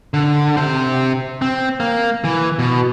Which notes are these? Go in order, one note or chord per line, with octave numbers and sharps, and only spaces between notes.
D3
C3 C5
C4
A#3
E3
B2